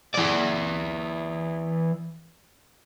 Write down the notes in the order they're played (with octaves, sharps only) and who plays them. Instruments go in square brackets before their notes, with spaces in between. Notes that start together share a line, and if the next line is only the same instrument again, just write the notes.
[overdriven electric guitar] E3 D5